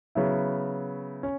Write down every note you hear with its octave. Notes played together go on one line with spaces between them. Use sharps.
C#3 F#3 B3 E4
C#4